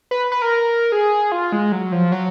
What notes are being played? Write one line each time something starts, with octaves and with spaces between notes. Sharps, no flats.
B4
B4
A#4
G#4
F4
G#3
F#3
F3
F#3